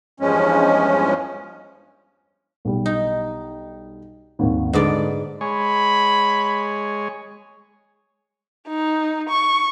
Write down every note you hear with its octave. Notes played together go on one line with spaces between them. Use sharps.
E2 G2 F3 G#3 C#4
B1 G3
D#4
D#1 G#1 D#2
G#2 D3 G#3 B3 D5
G#3 C#5 B5
D#4
C#6